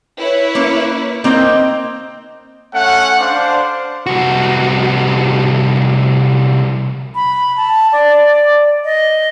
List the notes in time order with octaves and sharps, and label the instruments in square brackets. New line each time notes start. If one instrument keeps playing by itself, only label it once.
[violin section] E4 B4 C#5
[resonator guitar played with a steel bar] A#3 C#4
[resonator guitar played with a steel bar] A#3 C4 [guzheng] D#4 G5
[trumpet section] A3 C#4 F#5
D4 C5 D5 F5
[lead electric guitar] C2 F#4
[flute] B5
A5
D5
D#5